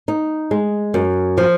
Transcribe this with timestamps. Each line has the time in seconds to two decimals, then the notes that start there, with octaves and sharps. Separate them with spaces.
0.08 D#4
0.51 G#3
0.94 F#2
1.38 F3